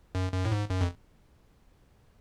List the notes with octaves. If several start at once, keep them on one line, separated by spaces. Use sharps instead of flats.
F#2
F#2
A2
G#2
F#2
F2